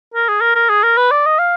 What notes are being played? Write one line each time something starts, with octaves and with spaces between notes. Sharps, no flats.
A#4
G#4
A#4
A#4
G#4
A#4
B4
D5
D#5
F5